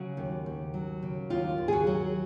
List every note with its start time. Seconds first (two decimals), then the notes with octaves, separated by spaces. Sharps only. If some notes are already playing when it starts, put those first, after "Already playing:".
Already playing: C#3 F#3 F#4
0.17 D#2
0.46 D#2
0.74 F#3
1.02 C#3
1.30 D#2 F4
1.58 D#2
1.68 G#4
1.73 F#4
1.87 F#3